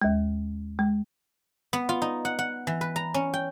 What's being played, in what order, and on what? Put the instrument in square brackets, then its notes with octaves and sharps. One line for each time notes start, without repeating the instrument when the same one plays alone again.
[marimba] D#2 G#3
G#3
[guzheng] B3
F4
D#4
F#5
F#5
E3
B4
A#5
C#4
G5